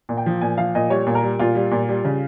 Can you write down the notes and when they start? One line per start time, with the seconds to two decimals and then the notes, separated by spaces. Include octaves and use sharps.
0.09 A#2
0.17 G5
0.26 F3
0.41 A#2 G#5
0.58 F3 F5
0.75 A#2 D#5
0.90 G3 C#5
1.07 A#2
1.15 A#4
1.23 G3
1.39 A#2 F4
1.55 G3
1.71 A#2
1.89 G3
2.05 C#3